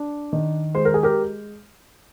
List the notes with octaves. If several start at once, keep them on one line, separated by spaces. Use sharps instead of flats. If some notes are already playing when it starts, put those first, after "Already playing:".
Already playing: D4
D#3
G#3 C5
A#4
G#4
G4 A#4